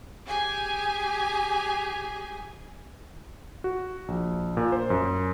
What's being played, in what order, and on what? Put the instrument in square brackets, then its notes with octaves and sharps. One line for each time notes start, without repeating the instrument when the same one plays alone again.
[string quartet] G4 G#4 G#5
[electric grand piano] F#4
A#1
A#2
C5
F#2